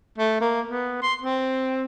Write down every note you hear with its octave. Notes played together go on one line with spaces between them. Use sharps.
A3
A#3
B3
C6
C4